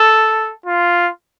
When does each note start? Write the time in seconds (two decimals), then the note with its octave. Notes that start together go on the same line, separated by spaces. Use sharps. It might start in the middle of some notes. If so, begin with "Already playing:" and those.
Already playing: A4
0.66 F4